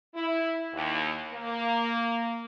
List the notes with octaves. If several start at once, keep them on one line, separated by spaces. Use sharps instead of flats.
E4
D#2
A#3